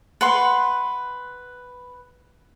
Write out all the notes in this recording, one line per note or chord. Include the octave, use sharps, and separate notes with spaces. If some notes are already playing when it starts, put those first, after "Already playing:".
B4 F#5 C6